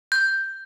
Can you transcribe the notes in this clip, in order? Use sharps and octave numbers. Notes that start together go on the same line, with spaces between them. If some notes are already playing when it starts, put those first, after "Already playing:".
G6